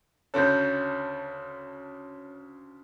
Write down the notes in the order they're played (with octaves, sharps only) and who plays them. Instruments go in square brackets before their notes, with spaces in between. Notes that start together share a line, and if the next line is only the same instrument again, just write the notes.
[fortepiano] D2 C#3 A4 [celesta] C#5 G6